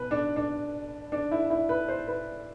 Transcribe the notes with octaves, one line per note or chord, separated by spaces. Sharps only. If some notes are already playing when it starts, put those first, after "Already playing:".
Already playing: B2 B4
D4
D4
D4
E4
E4
B4
C5
B4